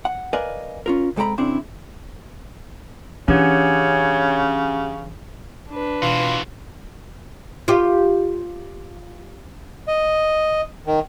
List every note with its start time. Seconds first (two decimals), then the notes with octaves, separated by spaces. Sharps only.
0.05 F#5
0.33 A#4 B4 D5 D#5 F5 G#5
0.86 C#4 F4 A#4
1.16 C3 G#3 A4 G5 A#5 B5
1.38 C#3 C4 D4 E4
3.28 C#3 E3 C#4 D4 G4 C#5 F#5
5.70 D4 B4
6.02 B2 E3 F4 F#4
7.68 F4 G4
9.88 D#5
10.87 D#3